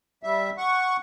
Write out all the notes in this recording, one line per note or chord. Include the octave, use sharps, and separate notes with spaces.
G3 E5
F#5 C#6